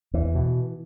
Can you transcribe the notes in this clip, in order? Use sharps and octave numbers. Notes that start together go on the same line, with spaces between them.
E2 E3
B2